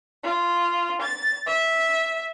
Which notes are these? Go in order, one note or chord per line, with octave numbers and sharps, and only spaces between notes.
F4
A6
E5